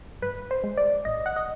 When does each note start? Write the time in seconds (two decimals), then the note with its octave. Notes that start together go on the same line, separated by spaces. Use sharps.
0.22 G2 B4
0.51 C5
0.64 G#3
0.77 D5
1.05 A1 D#5
1.26 F#5
1.36 D#5